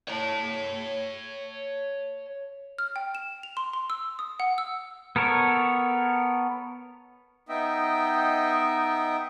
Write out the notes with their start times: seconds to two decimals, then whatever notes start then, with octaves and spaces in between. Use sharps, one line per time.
0.08 C#5 A5
2.78 F6
2.96 G5
3.15 E7
3.43 F7
3.57 C6
3.73 C6
3.90 E6
4.19 D#6
4.40 F#5
4.58 E6
5.16 B3 A4 A#4 C#5
7.49 B3 D#4 D#5 E5 G5